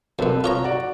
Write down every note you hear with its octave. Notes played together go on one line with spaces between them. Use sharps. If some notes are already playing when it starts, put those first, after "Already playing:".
F#2 B2 C4 A4 B4
F4 C#5 A#5
F#4 D5